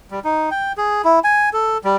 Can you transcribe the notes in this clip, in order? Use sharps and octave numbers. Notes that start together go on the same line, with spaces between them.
G3
D#4
G5
G#4
E4
G#5
A4
G3